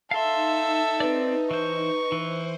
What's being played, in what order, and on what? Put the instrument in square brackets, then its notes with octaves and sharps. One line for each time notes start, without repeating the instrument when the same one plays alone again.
[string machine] D#4 [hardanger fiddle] A4 E5 [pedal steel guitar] F5 C6
[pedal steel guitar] C4 D5 [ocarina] B4
[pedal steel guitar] E3 C5 [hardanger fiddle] C#6
[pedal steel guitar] E3 [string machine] C5